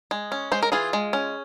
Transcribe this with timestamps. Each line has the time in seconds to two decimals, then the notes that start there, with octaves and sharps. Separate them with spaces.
0.11 G#3
0.32 C#4
0.52 G#3 C5
0.63 A#4
0.72 E3 F4 G#4
0.93 G#3
1.13 C#4